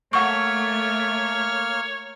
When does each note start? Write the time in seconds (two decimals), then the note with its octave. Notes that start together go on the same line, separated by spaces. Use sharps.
0.13 A3 A#3 C#5 F#5 C#6 F6